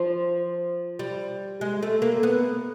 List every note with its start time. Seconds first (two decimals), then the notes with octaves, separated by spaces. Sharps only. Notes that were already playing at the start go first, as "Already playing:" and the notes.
Already playing: F3
0.99 G3
1.61 G#3
1.82 A3
2.02 A#3
2.23 B3